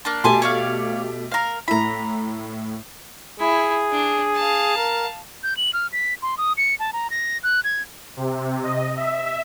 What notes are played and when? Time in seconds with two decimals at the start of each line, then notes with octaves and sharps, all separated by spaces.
0.05 A#3 D4
0.24 B2 A3 G4 G#5 A5 C6
0.42 C#5 D5 F5
1.32 A#4 F5
1.68 A2 E4 A#5 B5
3.40 E4 G#4
3.92 D4
4.35 F5 A5
4.77 A#4
5.43 G6
5.57 F#7
5.73 F6
5.92 B6
6.22 C6
6.38 D#6
6.57 C#7
6.80 A5
6.93 A#5
7.10 A#6
7.43 F#6
7.64 G#6
8.17 C3
8.63 D#5
8.97 E5